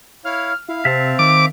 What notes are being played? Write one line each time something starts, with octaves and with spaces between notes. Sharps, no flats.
E4 C#5 F5 F6
E4 F5
C3 C4 E5 F5 A5
D#3 D6